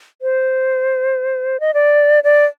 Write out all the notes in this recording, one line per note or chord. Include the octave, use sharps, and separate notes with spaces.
C5
D#5
D5
D5